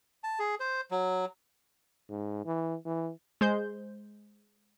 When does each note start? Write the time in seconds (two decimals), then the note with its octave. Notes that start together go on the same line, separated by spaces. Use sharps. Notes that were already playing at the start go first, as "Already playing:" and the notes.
0.24 A5
0.39 G#4
0.60 C5
0.91 F#3
2.10 G#2
2.46 E3
2.85 E3
3.41 G#3 C5 G6